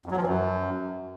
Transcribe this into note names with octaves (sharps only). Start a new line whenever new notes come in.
F2
F#3
F3
E3
F#2